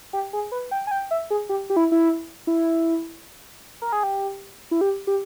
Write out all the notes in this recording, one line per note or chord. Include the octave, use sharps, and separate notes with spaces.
G4
G#4
B4
G5
G#5
G5
E5
G#4
G4
G4
E4
E4
E4
A#4
G#4
G4
E4
G4
G4